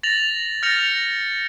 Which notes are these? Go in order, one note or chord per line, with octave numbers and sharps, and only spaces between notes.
A6 A#6 F7 F#7
F6 G6 A6 A#6 C#7 F7